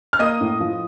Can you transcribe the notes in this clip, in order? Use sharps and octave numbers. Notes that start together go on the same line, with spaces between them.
F6
A#3 D#5 D#6
A2
F3